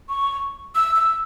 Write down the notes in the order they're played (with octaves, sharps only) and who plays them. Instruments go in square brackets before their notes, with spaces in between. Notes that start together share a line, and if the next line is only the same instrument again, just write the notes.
[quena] C#6
E6
E6